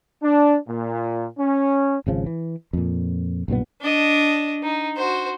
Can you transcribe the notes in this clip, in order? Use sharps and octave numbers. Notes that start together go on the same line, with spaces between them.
D4
A#2
C#4
G#1 C#3 F3
E3
F2 A#2
B1 G2 A#2 B3
D4 D#5
D#4
F#4 C5